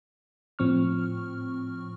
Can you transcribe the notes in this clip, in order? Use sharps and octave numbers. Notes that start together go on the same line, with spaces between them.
A2 F3 C4 C#6 F6